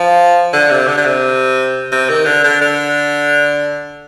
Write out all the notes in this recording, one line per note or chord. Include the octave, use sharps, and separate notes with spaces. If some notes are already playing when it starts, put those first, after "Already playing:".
Already playing: F3
D3
C3
D3
D3
C3
C3
D#3
D3
D3
D3